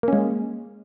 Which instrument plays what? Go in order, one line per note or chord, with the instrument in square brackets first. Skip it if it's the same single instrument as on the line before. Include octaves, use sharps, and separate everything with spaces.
[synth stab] A#3
C#4
G#3